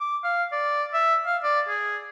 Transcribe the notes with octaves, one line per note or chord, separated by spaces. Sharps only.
D6
F5
D5
E5
F5
D5
G#4